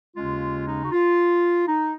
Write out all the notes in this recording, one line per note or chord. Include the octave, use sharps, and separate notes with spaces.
D#2 C#3 G#3 C#4 F4
D#4
F#4
F4
D#4